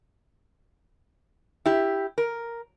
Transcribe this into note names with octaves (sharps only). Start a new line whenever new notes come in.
E4 G4
A#4